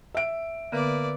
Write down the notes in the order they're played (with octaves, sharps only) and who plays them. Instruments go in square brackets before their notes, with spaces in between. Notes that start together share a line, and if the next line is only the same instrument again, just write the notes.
[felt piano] E5 D7
[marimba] D3 B3 [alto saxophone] A#3 [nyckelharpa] B4 D5